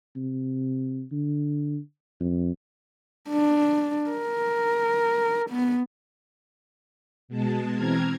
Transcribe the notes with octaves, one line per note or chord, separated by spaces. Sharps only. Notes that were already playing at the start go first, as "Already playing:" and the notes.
C3
D3
F2
D4
A#4
B3
B2 G#3 A5
E3 C4 A#5 F6 G#6